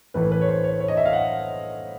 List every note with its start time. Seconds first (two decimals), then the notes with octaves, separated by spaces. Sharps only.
0.14 A2 E3 A3 B4
0.32 B4
0.41 C#5
0.48 C5
0.64 C#5
0.80 C#5
0.88 D#5
0.97 E5
1.05 F5
1.13 F#5